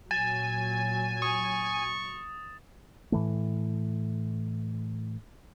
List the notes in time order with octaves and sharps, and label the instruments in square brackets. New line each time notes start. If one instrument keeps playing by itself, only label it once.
[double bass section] A#2 F#3 [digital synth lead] G#5 [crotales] A6 E7
[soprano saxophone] C#6 [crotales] D#6
[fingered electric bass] A2 E3 A3